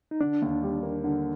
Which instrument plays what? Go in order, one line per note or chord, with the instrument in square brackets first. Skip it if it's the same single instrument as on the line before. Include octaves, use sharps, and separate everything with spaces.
[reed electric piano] D#4
[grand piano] D3 [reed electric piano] D4
[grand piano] D#2
G3
A#3
D3